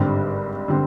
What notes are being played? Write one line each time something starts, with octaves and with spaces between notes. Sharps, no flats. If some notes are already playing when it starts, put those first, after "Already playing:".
Already playing: G#1 G2 D3 G3 C4
D3 G3 C4